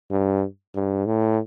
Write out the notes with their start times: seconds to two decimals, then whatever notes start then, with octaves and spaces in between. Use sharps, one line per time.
0.11 G2
0.75 G2
1.06 A2